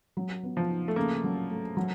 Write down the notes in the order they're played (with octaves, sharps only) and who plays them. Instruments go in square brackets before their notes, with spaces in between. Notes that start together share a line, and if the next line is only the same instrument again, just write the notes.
[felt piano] F#3
B3
[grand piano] F3
[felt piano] D#4
[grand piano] A3
[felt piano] C#3 [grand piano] A#3
[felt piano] F#3
A3
F#3